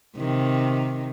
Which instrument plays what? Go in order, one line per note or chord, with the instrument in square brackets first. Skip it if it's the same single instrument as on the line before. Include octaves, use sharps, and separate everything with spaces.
[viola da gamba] C3 D#3